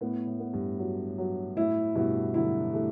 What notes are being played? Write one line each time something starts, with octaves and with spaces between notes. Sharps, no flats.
A2 B3
A2
B3
G2
F#3
F#3
A2 E4
G2 B2 E4
D3 F#3 E4
E3 G3 A3